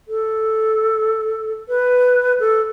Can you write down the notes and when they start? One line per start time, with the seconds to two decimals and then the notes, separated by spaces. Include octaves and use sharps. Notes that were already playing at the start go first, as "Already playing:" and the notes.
0.08 A4
1.69 B4
2.40 A4